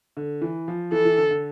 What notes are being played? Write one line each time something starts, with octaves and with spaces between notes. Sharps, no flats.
D3
E3
F3
E3 A4
E3
D3
D3